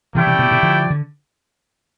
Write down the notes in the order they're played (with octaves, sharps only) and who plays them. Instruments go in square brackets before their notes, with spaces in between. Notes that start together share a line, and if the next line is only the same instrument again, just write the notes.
[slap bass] C3 E3 [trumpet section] A3 E4 G4 D5 G5
[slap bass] C3 E3
B2 D3
B2 D3
D3 F3
D3